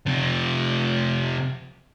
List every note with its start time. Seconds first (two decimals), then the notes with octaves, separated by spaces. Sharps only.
0.07 C3 F3